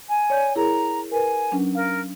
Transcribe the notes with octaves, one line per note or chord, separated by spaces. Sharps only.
G#5
C#5 D5 G6
E4 G#4 A#4 A#5
A#4 B4 G#5
F#3 C#4 D4
A#4 F5